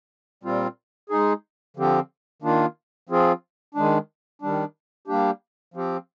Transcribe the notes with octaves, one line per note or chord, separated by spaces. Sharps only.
A#2 G3 C4 F4
G#3 D#4 G#4
D3 F3 C4 G4
D#3 A#3 D4 F4
F3 C4 F4 G#4
D#3 G#3 D4
D#3 G3 D4
G3 A#3 D4 G4
F3 C4 G4